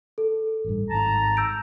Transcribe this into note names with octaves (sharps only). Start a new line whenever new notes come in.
A4
A1 G2
G#1 G#2 A5 A#5
E6 G6 D7